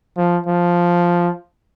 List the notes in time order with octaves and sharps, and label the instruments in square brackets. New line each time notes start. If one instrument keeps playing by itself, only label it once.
[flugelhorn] F3
F3